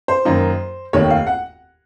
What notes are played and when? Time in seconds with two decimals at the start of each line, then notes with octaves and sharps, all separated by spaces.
0.08 C5
0.25 F#2 D#3 A#3 D#4
0.93 F1 D#2 D#3 C#5
1.10 F5
1.27 F#5